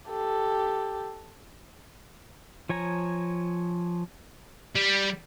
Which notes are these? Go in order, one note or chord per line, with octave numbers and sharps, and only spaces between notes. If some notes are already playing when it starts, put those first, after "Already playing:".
G4 A4
F3 C#5 G#5 A#5
G3